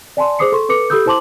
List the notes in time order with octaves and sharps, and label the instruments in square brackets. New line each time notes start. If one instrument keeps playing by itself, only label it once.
[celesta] D5 G#5 A5 C6
G#4 C5 D6 D#6 C7 C#7
A4 C6 C#6
A4 B4 D6 C#7
G4 A4 B5 D#6 E6 G6
E4 C5 A5 C6 D6 F#7